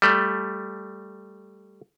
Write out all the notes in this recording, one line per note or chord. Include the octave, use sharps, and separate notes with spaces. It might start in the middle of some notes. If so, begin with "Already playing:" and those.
G3 A3